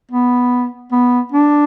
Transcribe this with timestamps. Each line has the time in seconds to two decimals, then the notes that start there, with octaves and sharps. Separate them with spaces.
0.11 B3
0.92 B3
1.32 D4